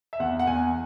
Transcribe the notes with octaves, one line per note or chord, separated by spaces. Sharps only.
E5
E2 F#5
F#5
E2 G#5